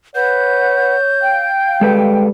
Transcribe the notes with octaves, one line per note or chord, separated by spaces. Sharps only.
B4 C#5 F#5 G6
F5 G5
G3 G#3 A4 B4